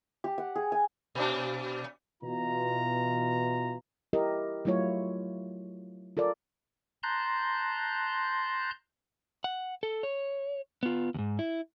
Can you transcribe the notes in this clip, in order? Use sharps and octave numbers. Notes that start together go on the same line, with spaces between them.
G4
F#5
G#4
G#5
B2 D4
B2 E3 F4 A#5
E4 G4 A#4 D#5
F#3 A3 E4 F4 C#5
F4 A4 A#4 D5
A5 A#5 C6 F#6 G6
F#5
A4
C#5
B3 F4
D#2 G#2
E4